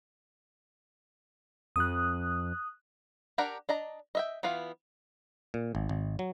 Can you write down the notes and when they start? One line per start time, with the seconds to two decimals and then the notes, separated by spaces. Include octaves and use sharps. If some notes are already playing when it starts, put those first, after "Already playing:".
1.76 F2 D#6 F#6
3.38 D4 G4 A#4 F#5 A#5
3.69 D4 D#5 A#5
4.15 D#5 E5 G5
4.43 E3 B3 F4 F5
5.54 A#2
5.75 G#1
5.89 G#1
6.19 F#3